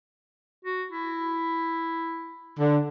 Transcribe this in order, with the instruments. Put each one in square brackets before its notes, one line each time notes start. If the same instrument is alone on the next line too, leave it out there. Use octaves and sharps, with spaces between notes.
[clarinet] F#4
E4
[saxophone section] D3